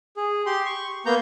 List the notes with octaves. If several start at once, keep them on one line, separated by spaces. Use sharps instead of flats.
G#4
G4 C6
C#6
A#3 B3 A#5 G6